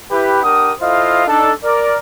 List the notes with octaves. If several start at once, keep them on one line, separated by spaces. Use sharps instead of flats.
E4 G4 B4
D4 G4 A#4 F#5 D#6
E4 F4 A4 C5 D#5 F5
D4 D#4 A4
A#4 D5